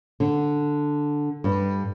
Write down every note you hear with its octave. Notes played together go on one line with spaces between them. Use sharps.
D3
G2